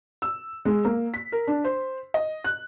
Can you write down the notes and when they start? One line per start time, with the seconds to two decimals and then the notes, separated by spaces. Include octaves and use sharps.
0.22 E6
0.65 G#3
0.85 A#3
1.14 B6
1.32 A#4
1.47 D4
1.64 C5
2.14 D#5
2.44 F#6